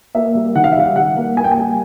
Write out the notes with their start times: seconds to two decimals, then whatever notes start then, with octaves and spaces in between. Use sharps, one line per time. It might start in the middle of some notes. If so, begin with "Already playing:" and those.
0.15 A#3 E5
0.35 G3
0.55 D#3 F#5
0.64 F5
0.72 E5
0.76 G3 F5
0.96 G3 F#5
1.17 A#3
1.37 A#3 G#5
1.44 G5
1.51 G#5
1.58 G3